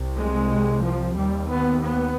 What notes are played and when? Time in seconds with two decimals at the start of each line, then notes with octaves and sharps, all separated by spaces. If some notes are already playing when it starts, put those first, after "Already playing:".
Already playing: C2 C3
0.18 G#3
0.84 F3
1.16 D#2 G3
1.50 B3
1.82 B3